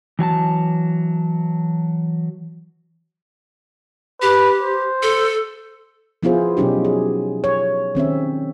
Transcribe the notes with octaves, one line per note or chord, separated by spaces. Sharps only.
E3 F#3 G#5 A5
G4 B4
C5
A4
F3 B3 E4 F4 G#4 C5
B2 F#3 C#4 D#4 G4
G#4
C#5
D#3 C4 C#4 E5